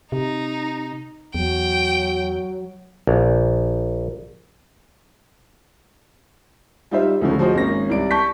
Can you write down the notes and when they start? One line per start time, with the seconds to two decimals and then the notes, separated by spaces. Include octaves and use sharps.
0.12 C3 D#4
1.35 E2 F#3 G5
3.07 A#1
6.91 G3 D#4 F4 C5 E5
7.21 D2 C#3 E3 F3 A3 C#4
7.39 F3 F#4 G#4 C5 D#5
7.55 G#1 A#3 C#4 A#6
7.89 C2 E4 D5 D7
8.11 A5 C#6 G6 B6